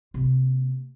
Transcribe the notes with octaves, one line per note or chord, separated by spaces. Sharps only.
C3 A#3